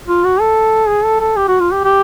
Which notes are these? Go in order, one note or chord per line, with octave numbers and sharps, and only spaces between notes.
F4
F#4
A4
G#4
A4
A4
G4
F#4
F4
G4
G4